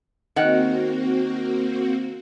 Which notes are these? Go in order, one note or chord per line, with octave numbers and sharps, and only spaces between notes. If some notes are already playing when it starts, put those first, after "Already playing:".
D#3 A#3 C4 F#4 F#5